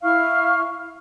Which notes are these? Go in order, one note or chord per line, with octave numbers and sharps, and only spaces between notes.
E4 F5 C#6 F6